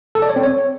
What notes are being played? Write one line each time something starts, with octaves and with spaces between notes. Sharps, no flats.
A4
D5
C#5
C4
C#5